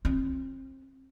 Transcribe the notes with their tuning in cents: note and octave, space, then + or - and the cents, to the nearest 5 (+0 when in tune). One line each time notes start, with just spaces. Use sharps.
C4 +30 F4 +0